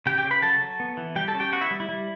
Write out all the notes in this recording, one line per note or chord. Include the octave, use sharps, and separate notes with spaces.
C#3 G4 G5
G4 G5
C#3
B4 B5
F#3 A4 A5
F#3
B3
E3
G3 G4 G5
A4 A5
C#4
G4 G5
B3 F#4 F#5
E4 E5
G3
E4
G3